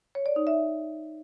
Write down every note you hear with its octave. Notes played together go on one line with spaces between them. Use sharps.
C#5
D5
D#4
E5